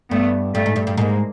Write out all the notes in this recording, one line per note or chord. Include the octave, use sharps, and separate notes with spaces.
G2 A3 B3
G2 G3 A3
G#2
G2
G2
G#2 G#3 A#3